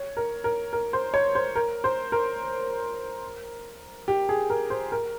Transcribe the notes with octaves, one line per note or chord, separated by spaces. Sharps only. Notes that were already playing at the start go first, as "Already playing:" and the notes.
Already playing: C#5
A#4
A#4
A#4
C5
C#5
C5
A#4
C5
A#4
G4
G#4
A#4
C5
A#4